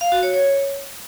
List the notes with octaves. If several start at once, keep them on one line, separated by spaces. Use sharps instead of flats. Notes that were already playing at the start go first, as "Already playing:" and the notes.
F5
F#4
C#5
C#5